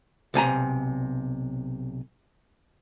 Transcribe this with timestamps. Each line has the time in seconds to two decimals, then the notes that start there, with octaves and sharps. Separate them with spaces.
0.34 B1 C3 G#5 A#5